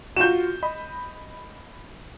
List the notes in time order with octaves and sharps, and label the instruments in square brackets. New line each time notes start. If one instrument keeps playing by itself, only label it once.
[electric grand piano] F4 F#4 [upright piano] G6 E7
[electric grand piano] D#5 B5